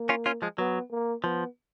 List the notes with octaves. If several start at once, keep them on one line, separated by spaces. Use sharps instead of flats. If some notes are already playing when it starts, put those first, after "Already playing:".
Already playing: A#3
C#4 F4
C#4 F4
F3 G#3
F#3 B3
A#3
F3 B3